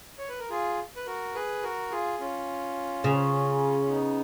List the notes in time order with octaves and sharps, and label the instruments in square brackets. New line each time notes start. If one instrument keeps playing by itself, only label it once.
[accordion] C#5
B4
A#4
F4 G#4
B4
F#4 A#4
G#4 B4
F#4 A#4
F4 G#4
C#4 F4
[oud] C#3
[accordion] F4
B3 D#4